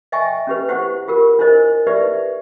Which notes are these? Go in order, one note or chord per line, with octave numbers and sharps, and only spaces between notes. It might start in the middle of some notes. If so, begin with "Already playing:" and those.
D#5 E5 G5 G#5 C#6
C#4 G4 B4
E4 G4 C5 F#5 C#6
F4 G4 A#4
D4 E4 A#4 C5 D#5
D#4 G4 B4 D5 E5